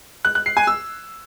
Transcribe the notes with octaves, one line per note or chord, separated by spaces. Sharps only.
F#6
F#6
C7
G#5
E6